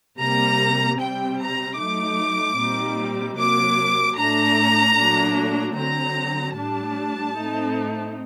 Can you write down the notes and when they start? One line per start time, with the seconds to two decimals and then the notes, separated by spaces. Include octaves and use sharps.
0.19 C3 G3 A#3 A#5
0.99 C3 G3 C4 G5
1.39 A#5
1.79 F#3 A3 D#4 D6
2.58 A#2 G3 C4 D#4
3.38 C3 F#3 A#3 D6
4.17 A2 A3 D4 A#5
4.98 A#2 F#3 A3 D4
5.77 D3 F#3 C4 A#5
6.57 A2 G3 D4 A5
7.37 A2 A3 C4 D#4